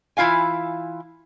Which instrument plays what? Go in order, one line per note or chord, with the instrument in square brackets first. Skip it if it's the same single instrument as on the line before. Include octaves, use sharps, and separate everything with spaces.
[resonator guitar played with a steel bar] E3 E4 F4 F5 G#5